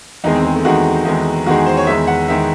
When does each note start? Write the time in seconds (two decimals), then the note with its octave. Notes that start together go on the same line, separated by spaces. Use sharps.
0.24 E2 D#3 G#3 D#4
0.35 C4
0.45 G#3
0.55 A3
0.65 E2 D#3 G#3 F#4
1.05 E2 D#3 G#3
1.46 E2 D#3 G#3 F#4
1.57 G#4
1.66 C5
1.77 C#5
1.87 E2 D#3 G#3 E5
2.07 F#5
2.28 E2 D#3 G#3 E5